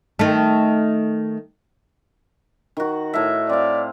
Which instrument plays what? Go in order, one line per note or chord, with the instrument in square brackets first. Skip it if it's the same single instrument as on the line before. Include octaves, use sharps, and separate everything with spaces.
[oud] D#3 A3
[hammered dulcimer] D#3 F#4
A2 E5
[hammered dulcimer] C4 F5 [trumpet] D5